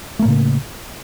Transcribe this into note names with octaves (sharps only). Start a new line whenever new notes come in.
A2 C#3 A3 A#3